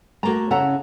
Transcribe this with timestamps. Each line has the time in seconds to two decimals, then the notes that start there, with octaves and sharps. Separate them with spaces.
0.23 A3 A#3 F#4 A#5
0.51 C#3 C#4 E4 A4 F#5 A#5